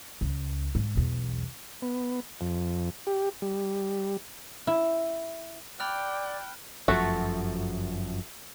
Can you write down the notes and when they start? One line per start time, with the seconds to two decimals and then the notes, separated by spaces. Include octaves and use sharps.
0.21 C#2
0.75 G#2
0.95 B1 E2
1.82 B3
2.41 F2
3.07 G4
3.42 G3
4.67 E4
5.80 D5 G5 B5 F6 F#6
6.88 G1 F#2 F3 A3 F#4 A4